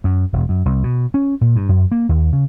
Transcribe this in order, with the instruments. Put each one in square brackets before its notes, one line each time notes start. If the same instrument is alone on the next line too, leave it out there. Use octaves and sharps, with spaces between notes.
[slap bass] F#2
E1
F#2
C2
B2
C#4
A#2
G2
F#2
A#3
D#2
C#3